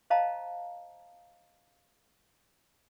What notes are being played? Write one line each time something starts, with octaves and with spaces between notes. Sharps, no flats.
C5 D#5 F5 A5 A#5